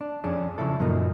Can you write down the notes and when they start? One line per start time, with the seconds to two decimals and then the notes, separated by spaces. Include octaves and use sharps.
0.01 D4
0.24 F2 C#4 D4 G#4
0.58 C#3 F3 E4 A4
0.79 F#2 A#2 F3 A#3 D#4